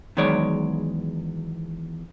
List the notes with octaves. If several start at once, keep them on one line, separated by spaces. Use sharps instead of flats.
E2 D#3 F#3 G#3 C#5 D5